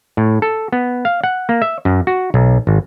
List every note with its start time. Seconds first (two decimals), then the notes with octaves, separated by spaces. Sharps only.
0.17 A2
0.42 A4
0.73 B3
1.05 F5
1.24 F#5
1.49 A#3
1.62 E5
1.85 F#2
2.07 F#4
2.34 B1
2.67 G#1